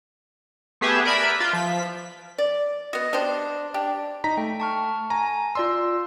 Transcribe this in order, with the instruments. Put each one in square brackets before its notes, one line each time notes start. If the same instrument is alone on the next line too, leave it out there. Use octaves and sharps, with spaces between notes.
[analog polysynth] A3 B3 G4 G#4 B4 E5
A#4 B4 D5 E5 B5
F4
F3 B6
[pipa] D5
[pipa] B3 F#4 [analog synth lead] D#5
[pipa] B3 G4 C5 [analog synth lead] D4
[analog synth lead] D4 [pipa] G4
[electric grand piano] D#4 A#5 B6
[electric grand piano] A3 [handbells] G5
[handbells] A5 C#6 F6
[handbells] G#5 [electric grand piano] A#5
[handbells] F4 D5 E6 [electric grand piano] C6